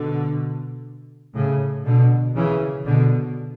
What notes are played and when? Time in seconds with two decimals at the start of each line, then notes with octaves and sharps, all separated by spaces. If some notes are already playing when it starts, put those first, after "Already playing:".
Already playing: B2 D3
1.35 A2 C#3
1.86 B2 D3
2.36 C#3 E3
2.86 B2 D3